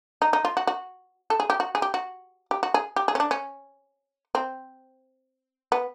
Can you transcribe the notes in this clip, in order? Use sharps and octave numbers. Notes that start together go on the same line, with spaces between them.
D#4
D#4
F4
F#4
F#4
A4
G#4
G4
F#4
G#4
G4
F#4
G4
F#4
G#4
G4
G#4
C#4
D4
C#4
C4
B3